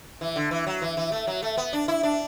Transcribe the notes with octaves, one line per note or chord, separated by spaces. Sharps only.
E3
D3
E3
F#3
E3
E3
A3
F#3
A3
B3
D4
E4
D4